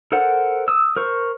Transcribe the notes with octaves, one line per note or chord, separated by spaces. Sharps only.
A4 A#4 C5 D5 F#5
D#6 E6
A#4 C5 C#6